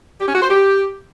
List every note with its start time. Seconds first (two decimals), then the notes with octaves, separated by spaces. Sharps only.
0.21 G4
0.28 C#4
0.35 F#4
0.41 C5
0.48 G4